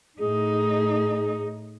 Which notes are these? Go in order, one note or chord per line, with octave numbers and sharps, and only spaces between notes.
A2 D#4 G#4